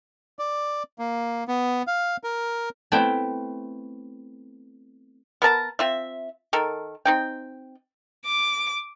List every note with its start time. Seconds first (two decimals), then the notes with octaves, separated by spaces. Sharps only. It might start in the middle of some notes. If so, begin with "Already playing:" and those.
0.39 D5
0.99 A#3
1.48 B3
1.87 F5
2.24 A#4
2.92 A3 B3 C4 E4 E5 G5
5.42 B3 A#4 A5 A#5
5.79 C4 F4 E5
6.53 D#3 A4 A#4
7.05 C4 D#4 G5
8.25 D6